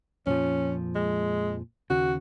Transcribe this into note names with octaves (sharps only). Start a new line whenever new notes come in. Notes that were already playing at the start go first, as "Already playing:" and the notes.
F2 A#2 F3 C#4
G#3
D#2 C#3 F#4